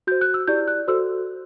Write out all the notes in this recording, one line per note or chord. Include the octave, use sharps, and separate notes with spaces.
F#4 C5 G6
F#6
E6
E4 G4 D5 G6
F#6
F#4 A4 C5 E6